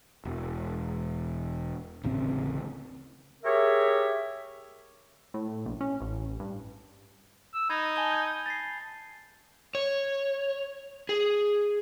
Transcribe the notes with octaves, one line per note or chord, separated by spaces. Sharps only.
E1
D1 A1 C#3 C4
G4 G#4 A#4 C#5 E5
A2
A#1
C#4
A1
G2
E6
D#4 B5 G#6
G#5 A5 G7
G6 G#6 D#7
A6 A#6 C7
C#5
G#4